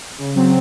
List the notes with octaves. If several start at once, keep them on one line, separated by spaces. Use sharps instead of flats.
C#3
F#3 C4